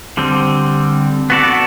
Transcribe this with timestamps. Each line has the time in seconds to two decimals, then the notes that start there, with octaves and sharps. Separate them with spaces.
0.17 D3 G3 C4
1.30 B3 F#4 A4 D5